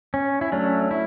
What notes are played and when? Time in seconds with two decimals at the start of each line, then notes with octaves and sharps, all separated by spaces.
0.14 C#4
0.41 E4
0.52 F#3 A3 C#4 D4
0.91 E4